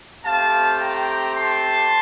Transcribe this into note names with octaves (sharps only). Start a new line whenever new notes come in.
A3 C4 G4 F5 A5
G5 A#5
A5 C6